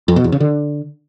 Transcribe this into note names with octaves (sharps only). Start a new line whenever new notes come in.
F2
B2
E2
C#3
D3